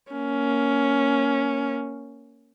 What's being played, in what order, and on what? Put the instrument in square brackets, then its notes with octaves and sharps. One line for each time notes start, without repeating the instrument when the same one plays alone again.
[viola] A#3 C#4